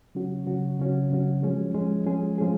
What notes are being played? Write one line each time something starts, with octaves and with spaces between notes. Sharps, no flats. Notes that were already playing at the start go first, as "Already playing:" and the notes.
C#3 F#3 C#4 F#4
C#3 F#3 C#4 F#4
C#3 F#3 C#4 F#4
C#3 F#3 C#4 F#4
F3 G#3 C#4 G#4
F3 G#3 C#4 G#4
F3 G#3 C#4 G#4
F3 G#3 C#4 G#4